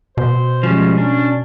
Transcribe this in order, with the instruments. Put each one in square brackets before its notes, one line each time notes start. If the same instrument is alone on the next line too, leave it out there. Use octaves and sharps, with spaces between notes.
[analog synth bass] B2 [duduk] C5
[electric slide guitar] F3 G3 G#3 [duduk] C#4
[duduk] C#4 [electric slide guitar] D4